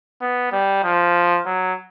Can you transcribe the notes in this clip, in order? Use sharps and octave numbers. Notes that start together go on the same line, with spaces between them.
B3
G3
F3
F#3